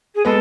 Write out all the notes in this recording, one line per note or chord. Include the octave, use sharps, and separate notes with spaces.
G#4
G#3 B3 A4